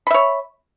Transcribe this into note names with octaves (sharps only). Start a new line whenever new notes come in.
C#5 E5 B5